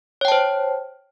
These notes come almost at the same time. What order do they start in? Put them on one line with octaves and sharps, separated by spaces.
C#5 G5 A5 C5